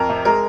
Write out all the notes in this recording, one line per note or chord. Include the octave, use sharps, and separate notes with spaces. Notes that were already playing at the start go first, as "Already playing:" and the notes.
Already playing: F2 A#4
C3
G#3 A#4